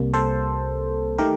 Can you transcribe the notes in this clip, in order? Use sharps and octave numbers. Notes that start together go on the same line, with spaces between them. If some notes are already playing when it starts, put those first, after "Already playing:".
Already playing: C2 C3 G3 A#3
A4 C5
D#3 A3 G4 A#4